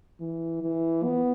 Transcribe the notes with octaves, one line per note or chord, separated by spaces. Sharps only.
E3
E3
B3